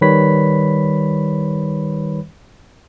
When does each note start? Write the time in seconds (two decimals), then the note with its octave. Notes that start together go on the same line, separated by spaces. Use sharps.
0.01 D#3 G3 B4 C#5 B5 B6